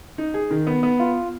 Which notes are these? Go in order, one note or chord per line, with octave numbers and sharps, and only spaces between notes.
D#4
G#4
D#3
B3
B3
F4